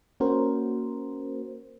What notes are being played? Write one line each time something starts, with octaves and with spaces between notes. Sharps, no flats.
A#3 C#4 F#4 A#4 C5